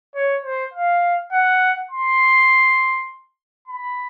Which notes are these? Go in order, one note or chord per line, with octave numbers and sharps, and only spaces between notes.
C#5
C5
F5
F#5
C6
B5